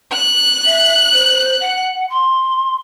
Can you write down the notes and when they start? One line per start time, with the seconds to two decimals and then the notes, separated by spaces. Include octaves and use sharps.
0.13 F#6
0.65 E5
1.12 C5
1.60 F#5
2.09 C6